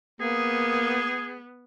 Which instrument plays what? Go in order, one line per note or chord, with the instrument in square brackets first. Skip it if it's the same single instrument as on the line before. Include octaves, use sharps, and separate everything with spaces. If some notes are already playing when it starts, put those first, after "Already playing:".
[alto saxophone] A#3 [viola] B3 [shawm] G#4